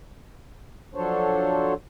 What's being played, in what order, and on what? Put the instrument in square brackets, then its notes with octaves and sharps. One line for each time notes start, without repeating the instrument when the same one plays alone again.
[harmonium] F3 F#3 D4 A4 C5 C#5